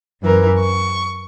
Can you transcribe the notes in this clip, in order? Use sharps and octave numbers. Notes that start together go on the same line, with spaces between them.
F#2 E3 A#4
C#6